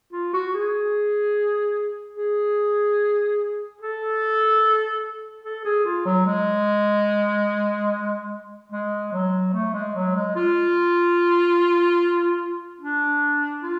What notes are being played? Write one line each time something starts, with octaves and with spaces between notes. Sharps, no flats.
F4
F#4
G#4
G#4
A4
A4
G#4
F4
F#3
G#3
G#3
F#3
A3
G#3
F#3
G#3
F4
D4
F4